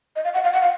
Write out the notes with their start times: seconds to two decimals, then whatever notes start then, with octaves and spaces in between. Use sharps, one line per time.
0.16 D#5
0.25 F5
0.34 F#5
0.44 F5
0.53 F#5
0.62 F5